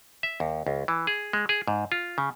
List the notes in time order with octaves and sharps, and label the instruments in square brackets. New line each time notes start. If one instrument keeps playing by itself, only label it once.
[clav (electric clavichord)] E5
D#2
C#2
E3
G#4
G#3
G#4
G#2
F4
C#3